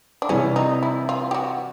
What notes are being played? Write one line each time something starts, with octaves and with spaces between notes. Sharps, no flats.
D4
C3 E3 G3 C#4
D#4
E4
F4
G4
F#4